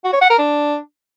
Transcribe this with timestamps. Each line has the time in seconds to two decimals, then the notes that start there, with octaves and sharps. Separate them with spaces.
0.04 F#4
0.13 C#5
0.21 F#5
0.30 A#4
0.39 D4